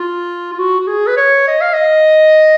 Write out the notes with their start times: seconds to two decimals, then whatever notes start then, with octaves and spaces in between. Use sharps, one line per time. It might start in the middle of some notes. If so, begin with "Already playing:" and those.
Already playing: F4
0.53 F4
0.59 F#4
0.81 F#4
0.87 G#4
1.07 B4
1.17 C#5
1.48 D#5
1.61 F5
1.74 D#5